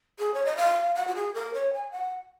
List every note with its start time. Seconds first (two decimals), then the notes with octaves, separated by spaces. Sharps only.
0.19 G#4
0.34 C#5
0.45 D#5
0.57 F5
0.95 F#5
1.08 F#4
1.15 G#4
1.34 A#4
1.54 C#5
1.73 G#5
1.92 F#5